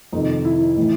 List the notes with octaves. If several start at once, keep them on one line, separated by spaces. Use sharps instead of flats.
F2 C3 D#3 D#4
E4
A2 E3